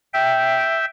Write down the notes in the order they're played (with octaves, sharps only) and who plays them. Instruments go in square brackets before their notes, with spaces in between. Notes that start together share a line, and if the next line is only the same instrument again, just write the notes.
[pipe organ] E5 G5